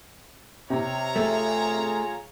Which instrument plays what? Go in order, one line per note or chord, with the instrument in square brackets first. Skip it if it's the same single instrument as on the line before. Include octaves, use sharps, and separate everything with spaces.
[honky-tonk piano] C3 [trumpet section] C#5 F5 A#5
[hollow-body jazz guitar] A3 [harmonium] F4 G#4